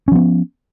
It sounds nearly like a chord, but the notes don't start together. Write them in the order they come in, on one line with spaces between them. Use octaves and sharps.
C#4 F3 B3